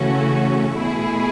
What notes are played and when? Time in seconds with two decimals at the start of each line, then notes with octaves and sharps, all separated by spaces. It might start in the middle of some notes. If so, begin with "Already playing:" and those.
Already playing: C#3 E3 A3 C#4 F#4
0.75 B2 A3 E4 G#4